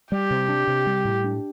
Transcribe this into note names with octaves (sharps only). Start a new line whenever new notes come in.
G3 G4
C3
D4
C3
G3
A2
D4